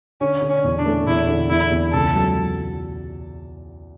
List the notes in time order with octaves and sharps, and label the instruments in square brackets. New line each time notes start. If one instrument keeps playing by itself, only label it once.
[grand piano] D3 [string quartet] C#4
[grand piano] D3
[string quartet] C#4
[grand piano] E2
[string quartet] D4
[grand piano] A3
[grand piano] E2 [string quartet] E4
[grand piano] D3
[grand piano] E2 [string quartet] E4
[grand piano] E2
[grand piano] C#2 [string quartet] A4
[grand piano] F#3